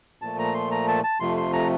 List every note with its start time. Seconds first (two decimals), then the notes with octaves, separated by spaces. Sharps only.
0.22 A#2 F3 A3 A5
0.39 A#5
0.54 C6
0.71 A#5
0.88 A5
1.04 A5
1.20 F2 C3 F3 A3 C6
1.37 C6
1.53 A#5